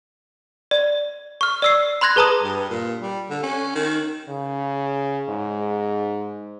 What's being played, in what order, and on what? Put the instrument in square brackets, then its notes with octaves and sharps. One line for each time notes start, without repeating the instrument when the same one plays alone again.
[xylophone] D5
C#6 F6
D5 E6 C7
B5 C6 F#6 G#6 A#6
G#4 B4 A5 A#5 D#6
[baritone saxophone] G2
A#2
G3
D3
C#4
D#3
[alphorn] C#3
G#2